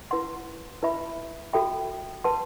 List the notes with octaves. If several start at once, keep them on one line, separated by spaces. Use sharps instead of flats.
E4 B4 F#5 C6
E4 B4 E5 B5
F#4 A4 E5 G5 B5
B4 F#5 A5 C6